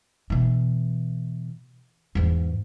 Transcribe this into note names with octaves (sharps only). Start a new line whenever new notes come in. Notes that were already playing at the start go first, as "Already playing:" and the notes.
B2 E3
E2 G#2